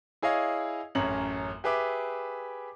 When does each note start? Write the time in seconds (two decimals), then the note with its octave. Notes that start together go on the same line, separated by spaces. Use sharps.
0.22 E4 G#4 C#5 D#5 F5
0.95 A1 F#2 C#4 A#5 F#7
1.64 G4 G#4 B4 E5 D6